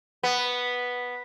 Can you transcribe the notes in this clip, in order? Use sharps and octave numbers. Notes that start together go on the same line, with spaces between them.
B3